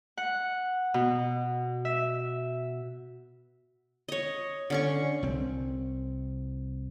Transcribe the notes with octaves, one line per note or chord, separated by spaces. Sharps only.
F#5
B2
E5
C#5 D#5
D3 C#4 C#6
C2 C4